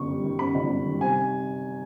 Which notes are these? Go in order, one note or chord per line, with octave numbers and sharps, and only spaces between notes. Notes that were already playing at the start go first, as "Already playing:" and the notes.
Already playing: G1 F#2 C#6
G3
D#3
F#2 B5
G1
G3
D#3
C3 G#5